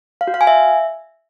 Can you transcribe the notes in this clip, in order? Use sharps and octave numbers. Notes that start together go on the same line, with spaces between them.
F5
F#4
F5
G#5
E5